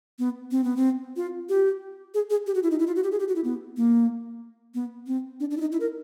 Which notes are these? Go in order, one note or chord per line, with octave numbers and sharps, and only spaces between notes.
B3
C4
B3
C4
F4
G4
G#4
G#4
G4
F#4
E4
D#4
E4
F4
F#4
G4
G#4
G4
F#4
E4
B3
A#3
B3
C4
D4
D4
E4
D#4
E4
A#4